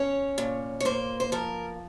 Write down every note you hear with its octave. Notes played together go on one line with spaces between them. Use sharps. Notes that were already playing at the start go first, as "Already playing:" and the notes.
Already playing: C#4 C#5
A#2
C#5
A#3 C5
C5
F3 A#4